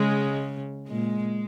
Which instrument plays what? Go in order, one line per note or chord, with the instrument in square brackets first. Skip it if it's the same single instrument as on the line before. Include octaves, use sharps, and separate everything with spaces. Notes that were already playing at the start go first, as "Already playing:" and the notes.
Already playing: [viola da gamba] C#3 [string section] G#3
[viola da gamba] A#2 [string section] G#3